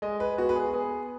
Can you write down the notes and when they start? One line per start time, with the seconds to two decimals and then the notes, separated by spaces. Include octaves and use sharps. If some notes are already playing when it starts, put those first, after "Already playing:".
0.02 G#3 D#5
0.20 B4
0.38 B3 F#4
0.49 B4
0.56 G#4
0.73 B3 G#4